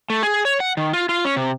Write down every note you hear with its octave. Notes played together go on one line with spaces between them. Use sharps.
A3
G#4
C#5
F#5
D#3
F4
F4
C#4
C3